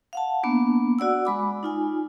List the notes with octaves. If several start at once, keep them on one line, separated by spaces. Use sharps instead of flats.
F5 F#5 A5
A#3 B3 D4
F#4 D5 F#5 E6
G#3 B5 D6
D#4 F4 G#5